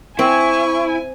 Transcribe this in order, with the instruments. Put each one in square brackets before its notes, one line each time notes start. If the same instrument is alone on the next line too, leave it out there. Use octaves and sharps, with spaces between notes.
[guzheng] C4 [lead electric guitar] E4 [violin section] G#5 [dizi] C#6